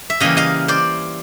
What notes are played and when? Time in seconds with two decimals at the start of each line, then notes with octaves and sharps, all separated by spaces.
0.10 E5
0.20 C#3 E3 G3 A#3 D#5 F5
0.37 D#5 F5
0.68 C5 D5